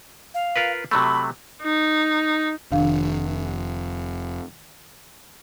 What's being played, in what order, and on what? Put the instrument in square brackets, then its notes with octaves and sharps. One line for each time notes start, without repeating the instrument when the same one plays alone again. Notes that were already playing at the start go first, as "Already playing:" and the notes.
[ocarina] F5
[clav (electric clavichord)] F4 A#4 B4
[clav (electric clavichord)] C3 F#3 A3 [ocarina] B5
[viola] D#4
[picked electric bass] F1 [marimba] D#3 D4 F5